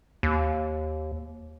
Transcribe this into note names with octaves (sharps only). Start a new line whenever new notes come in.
D#2